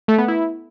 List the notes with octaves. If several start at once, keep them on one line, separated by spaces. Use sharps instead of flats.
A3
B3
E4